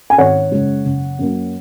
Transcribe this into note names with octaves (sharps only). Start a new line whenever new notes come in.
G#5
G#1 C#5 F#5
F#2 C#3 G#3
F#1
F#2 F#3 A#3